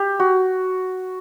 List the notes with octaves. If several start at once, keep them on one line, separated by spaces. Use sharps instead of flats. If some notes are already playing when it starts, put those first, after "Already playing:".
Already playing: G4
F#4